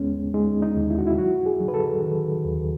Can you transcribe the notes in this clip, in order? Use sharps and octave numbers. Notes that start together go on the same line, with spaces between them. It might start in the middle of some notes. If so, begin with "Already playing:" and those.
Already playing: D#2 G#3 B3 C#4
G#3 D#4
D#4
D#2
E4
F#4
E4
F#3 F#4
G#4
F#3
B4
A4
D#3
D#2